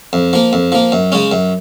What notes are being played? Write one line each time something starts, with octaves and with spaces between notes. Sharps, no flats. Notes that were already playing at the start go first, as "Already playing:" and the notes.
F2
F3 A#3
F2
F3 A#3
F#2
C#3 G#3 C#4
F#2